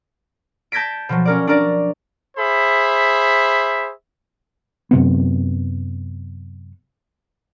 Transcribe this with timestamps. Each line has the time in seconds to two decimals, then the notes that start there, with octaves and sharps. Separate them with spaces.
0.72 A5 G6 G#6 A#6 B6 D7
1.09 B2 F3 F#3
1.25 C#4 A#4 D5
1.47 D4 F#4 A#4 D5
2.38 G#4 C5 E5 B5
4.91 F#2 C3 B3